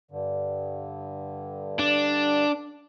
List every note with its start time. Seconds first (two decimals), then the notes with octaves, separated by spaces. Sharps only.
0.11 G2 D3
1.79 D4